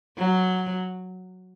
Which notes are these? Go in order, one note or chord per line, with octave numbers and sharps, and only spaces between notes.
F#3